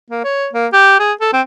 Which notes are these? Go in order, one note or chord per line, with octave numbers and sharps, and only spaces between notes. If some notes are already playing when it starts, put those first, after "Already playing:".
A#3
C#5
A#3
G4
G#4
A4
C4